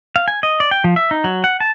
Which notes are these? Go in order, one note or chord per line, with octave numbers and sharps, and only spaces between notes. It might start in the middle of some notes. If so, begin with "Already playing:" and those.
F5
G#5
D#5
D5
G5
F3
E5
D#4
F#3
F#5
A5